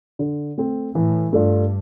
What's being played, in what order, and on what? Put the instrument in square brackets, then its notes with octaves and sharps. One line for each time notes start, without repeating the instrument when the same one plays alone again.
[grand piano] D3
A3 C4
[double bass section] A2 [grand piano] E3
[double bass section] G2 [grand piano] A3 D4 F4